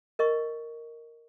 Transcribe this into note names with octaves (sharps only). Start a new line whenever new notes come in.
A#4 D#5 C#6